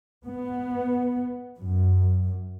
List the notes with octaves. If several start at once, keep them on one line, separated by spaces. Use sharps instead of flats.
B3
F#2